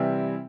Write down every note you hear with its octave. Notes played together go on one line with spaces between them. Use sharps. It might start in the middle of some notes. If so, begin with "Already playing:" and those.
Already playing: C3 E3 G3 C4 E4